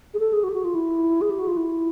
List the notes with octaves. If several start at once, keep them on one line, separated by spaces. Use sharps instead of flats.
G#4
A4
G#4
F#4
G4
F#4
F4
E4
G#4
G4
F#4
F4
E4